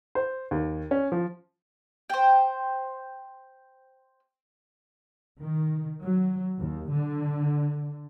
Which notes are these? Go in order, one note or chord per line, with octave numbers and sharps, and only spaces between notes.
C5
D#2
C#4
F3
C5 G5
D#3
F#3
D#2
D3